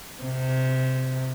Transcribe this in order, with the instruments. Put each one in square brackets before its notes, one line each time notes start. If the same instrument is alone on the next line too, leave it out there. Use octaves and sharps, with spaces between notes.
[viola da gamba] C3